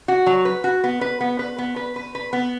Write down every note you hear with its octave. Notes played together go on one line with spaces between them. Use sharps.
F#4
F#3
B4
F#4
B3
B4
B3
B4
B3
B4
B4
B4
B3